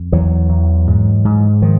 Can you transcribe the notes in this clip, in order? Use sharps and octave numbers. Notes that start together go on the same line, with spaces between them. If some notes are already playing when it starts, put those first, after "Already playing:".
Already playing: F2
E2 E3 F#3
E2
G#2
G#2
D#3 F3